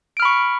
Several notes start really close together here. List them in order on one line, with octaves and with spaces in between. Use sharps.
D7 F6 B5 C#6